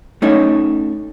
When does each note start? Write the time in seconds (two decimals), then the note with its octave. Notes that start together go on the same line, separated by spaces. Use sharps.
0.22 A3 C#4 D#4 A4 C#5